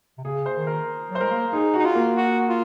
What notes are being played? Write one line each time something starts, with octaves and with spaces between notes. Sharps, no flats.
C3
C#3 G#4
C5
D#3
A#4
F#3
C5
G#3 A#4
A#3
D#4 G#4
D#4 F#4
F4
A#3
F#4
F4